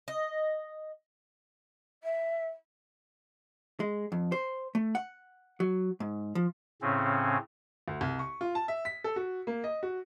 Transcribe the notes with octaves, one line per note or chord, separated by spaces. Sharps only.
D#5
E5
G#3
F2
C5
A3
F#5
F#3
G#2
F3
A2 C#3 C4 C#4
D2
C2
C#6
F4
A5
E5
B6
A4
F#4
A#3
D#5
F#4